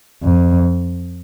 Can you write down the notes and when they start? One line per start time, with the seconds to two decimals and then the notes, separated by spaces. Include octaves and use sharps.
0.23 F2